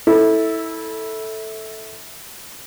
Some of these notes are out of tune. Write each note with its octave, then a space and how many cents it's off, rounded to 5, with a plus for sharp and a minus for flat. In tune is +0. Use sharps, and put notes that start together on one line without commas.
E4 -20 A4 +0